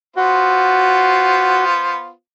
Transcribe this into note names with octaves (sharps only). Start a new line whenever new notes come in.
B3 F4 F#4 C5